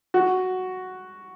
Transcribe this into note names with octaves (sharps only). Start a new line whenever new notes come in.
F#4